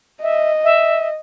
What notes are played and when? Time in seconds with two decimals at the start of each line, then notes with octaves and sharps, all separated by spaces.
0.22 D#5 E5
0.64 E5